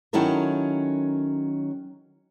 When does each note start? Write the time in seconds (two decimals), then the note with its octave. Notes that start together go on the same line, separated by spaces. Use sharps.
0.13 D#3 F#3 C#4 E4 A4 A#4